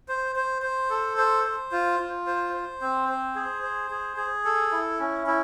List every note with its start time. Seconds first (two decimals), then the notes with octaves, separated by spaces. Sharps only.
0.08 C5
0.36 C5
0.62 C5
0.90 A4
1.18 C5
1.44 C5
1.72 F4
1.99 F4
2.27 C5
2.53 C5
2.81 C4
3.09 C5
3.35 G#4
3.63 C5
3.91 G#4
4.17 G#4
4.45 A4
4.72 E4
4.99 C#4
5.27 E4